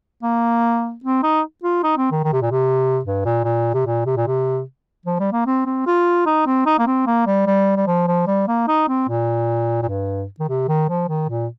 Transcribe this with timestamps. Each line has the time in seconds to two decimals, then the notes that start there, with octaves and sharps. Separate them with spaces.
0.23 A#3
1.04 C4
1.23 D#4
1.63 F4
1.83 D#4
1.97 C4
2.11 D#3
2.24 D#3
2.33 C3
2.42 A#2
2.51 C3
3.05 G2
3.25 A#2
3.44 A#2
3.74 C3
3.85 A#2
4.06 C3
4.16 A#2
4.27 C3
5.06 F3
5.20 G3
5.32 A#3
5.46 C4
5.66 C4
5.86 F4
6.26 D#4
6.46 C4
6.66 D#4
6.79 A#3
6.87 C4
7.07 A#3
7.27 G3
7.47 G3
7.77 G3
7.87 F3
8.07 F3
8.27 G3
8.48 A#3
8.68 D#4
8.88 C4
9.08 A#2
9.82 A#2
9.88 G2
10.40 D#3
10.49 C3
10.68 D#3
10.89 F3
11.09 D#3
11.29 A#2